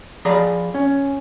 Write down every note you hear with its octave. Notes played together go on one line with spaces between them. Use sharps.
F3 G#4 D5 D#5 A#5 B5
C#4